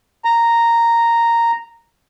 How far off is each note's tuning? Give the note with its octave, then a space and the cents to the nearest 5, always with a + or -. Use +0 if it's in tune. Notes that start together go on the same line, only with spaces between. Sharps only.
A#5 -5